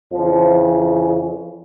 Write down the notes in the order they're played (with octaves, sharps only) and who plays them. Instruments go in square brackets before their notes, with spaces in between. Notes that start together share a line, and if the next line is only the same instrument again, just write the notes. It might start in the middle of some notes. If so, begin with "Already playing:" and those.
[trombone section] F2 C#3 E3 F3